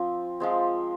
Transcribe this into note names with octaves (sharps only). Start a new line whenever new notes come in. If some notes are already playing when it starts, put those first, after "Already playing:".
Already playing: F3 C4
F3 G#3 C4